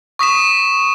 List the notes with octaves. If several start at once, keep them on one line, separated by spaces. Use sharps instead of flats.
C#6 D#6 B6 E7